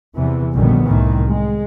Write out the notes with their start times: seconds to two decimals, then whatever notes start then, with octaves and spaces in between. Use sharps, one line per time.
0.16 E2 C3 E3 B3
0.54 A#1 F#2 D3 D#3 G3 B3
0.85 C2 A2 D#3 E3
1.27 G#3